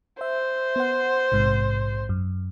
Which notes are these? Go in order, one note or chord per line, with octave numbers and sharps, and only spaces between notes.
C5 E5
B3 F#5
A#1 G#2 C3
F#2